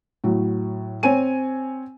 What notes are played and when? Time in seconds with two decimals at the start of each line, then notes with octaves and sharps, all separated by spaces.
0.24 A2 F#3
1.03 C4 C#5 G#5 D#7